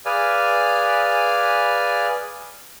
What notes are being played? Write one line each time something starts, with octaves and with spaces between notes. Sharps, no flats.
G#4 B4 D5 F5 G#5